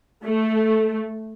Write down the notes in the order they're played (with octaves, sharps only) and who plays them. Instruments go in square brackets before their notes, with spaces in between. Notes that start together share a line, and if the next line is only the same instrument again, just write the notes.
[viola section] A3